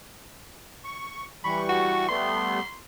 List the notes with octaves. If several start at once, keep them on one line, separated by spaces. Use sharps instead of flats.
C#6
E3 G3 B5 C#6
F#4
G3 A3 B3 C6